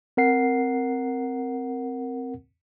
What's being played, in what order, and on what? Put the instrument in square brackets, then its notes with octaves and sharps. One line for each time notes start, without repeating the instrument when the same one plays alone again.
[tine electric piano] C4 A#4 F#5 C7